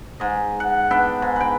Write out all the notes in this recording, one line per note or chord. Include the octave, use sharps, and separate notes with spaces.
G#2 D#5
F#5
B3 D4 E5 G5
G#2
B4 G5